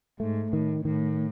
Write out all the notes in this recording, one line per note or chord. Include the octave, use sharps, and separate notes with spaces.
G#2 A3
A2 D#3
A2 D#3